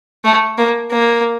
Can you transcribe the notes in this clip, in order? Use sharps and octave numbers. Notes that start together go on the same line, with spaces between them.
A3
A#3
A#3